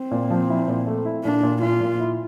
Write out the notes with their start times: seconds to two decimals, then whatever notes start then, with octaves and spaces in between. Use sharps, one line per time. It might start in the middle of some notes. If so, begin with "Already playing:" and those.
Already playing: C4
0.11 A#2
0.30 F3
0.49 E4
0.68 A#2
0.87 A3
1.05 E4
1.24 A#2 D4
1.43 A#2
1.62 A#2 F4
1.81 A#2
2.00 E4